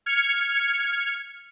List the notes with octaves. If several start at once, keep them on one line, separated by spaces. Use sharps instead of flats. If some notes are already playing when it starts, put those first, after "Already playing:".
F6 G#6 C#7